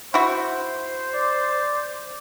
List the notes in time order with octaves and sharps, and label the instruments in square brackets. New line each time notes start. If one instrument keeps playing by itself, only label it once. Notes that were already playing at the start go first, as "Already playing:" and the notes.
[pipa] E4 F#4 [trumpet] C5
[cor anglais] D5